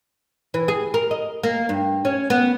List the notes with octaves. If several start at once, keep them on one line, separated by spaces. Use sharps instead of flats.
E3
G#4
A#4
D#5
A#3
G2
C#4
B3